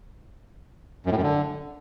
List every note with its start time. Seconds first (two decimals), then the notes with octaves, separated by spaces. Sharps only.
1.06 F#2
1.12 A2
1.17 F#2
1.23 D3